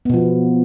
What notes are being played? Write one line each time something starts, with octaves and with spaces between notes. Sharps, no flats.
B2 F3 B3